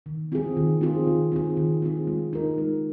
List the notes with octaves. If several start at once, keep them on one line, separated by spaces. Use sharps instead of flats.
D#3
C4 F4 G#4
D#3
C4 F4 G#4
D#3
C4 F4 G#4
D#3
C4 F4 G#4
G#3
D#4 A#4
G#3